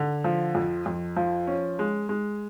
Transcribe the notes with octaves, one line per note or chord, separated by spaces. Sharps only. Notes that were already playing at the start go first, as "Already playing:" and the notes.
Already playing: D3
F3
F2
F2
F3
C#4
G#3
G#3